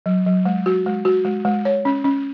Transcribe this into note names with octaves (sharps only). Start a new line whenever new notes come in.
F#3
F#3
G#3
F#4
G#3
F#4
G#3
G#3
C#5
C#4
C#4